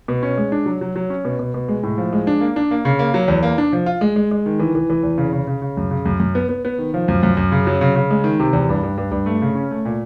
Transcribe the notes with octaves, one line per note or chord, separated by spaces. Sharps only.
B2
C#4
G#3
D4
F#3
F#3
F#3
C#4
B2
B2
B2
G#3
A2
F3
G#3
D4
A#3
D4
A#3
C#3
A#3
F#3
E2
A#3
D4
F3
F4
G#3
G#3
G#3
D#3
E3
E3
E3
E2
C#3
C#3
C#3
C#3
F#2
C#3
F#2
F#2
B3
B3
B3
D#3
F3
F#2
F#2
F#2
C#3
F#3
C#3
C#3
G#3
D#3
C3
E2
G2
G2
G2
G2
A3
C#3
C#4
A3
A#2